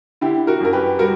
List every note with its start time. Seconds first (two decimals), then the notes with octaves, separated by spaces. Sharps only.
0.21 D3 E4 G4
0.47 F#4 A#4
0.60 F#2 A#4
0.73 G4 B4
0.99 G3 F#4 A#4